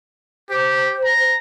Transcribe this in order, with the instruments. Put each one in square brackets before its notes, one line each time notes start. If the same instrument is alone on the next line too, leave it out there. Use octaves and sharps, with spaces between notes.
[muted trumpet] G4 [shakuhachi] C5
[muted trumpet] A#5